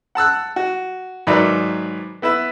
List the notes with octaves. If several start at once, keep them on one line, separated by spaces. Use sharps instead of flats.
F#5 A5 E6 F#6
F#4
G#2 D#3 F#3 B4 D5 E5
B3 E4 B4 E5